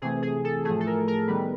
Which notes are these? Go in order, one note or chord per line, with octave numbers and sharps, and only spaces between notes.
C3 E3 A3 G#4
G#4
A4
A2 F3 A3 G#4
A4
A#4
A#4
D#3 G3 B3 B4